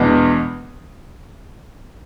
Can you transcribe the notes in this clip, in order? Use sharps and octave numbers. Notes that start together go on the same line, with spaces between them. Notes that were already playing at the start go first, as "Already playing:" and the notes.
Already playing: E2 B2 G#3 B3 D4